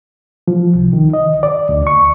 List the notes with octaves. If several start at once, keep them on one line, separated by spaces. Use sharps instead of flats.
F3
C2
D#3
D#5
D5
D2
C#6